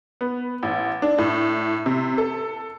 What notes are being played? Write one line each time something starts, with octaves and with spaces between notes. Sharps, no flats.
B3
A1
D4
A2
C3
A4